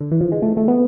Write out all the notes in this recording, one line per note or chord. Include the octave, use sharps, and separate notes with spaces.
D3
E3
F3
G#3
A3
A3
B3